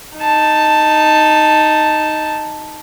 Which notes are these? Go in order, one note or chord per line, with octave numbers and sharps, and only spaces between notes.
D#4 A5